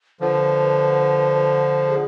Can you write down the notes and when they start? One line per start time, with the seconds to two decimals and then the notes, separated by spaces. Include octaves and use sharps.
0.21 D3 F3 B4
1.87 G#4